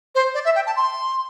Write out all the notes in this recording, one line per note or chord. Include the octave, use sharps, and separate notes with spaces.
C5
D5
E5
G5
A5
C6